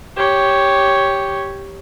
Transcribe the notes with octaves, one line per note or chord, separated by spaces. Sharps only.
G4 C#5